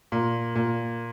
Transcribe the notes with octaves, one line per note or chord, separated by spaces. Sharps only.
A#2
A#2